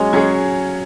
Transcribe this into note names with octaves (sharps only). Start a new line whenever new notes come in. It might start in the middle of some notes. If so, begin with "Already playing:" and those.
Already playing: F#3 G#3 C#4 C#5
F#3 C#4 G#4 C#5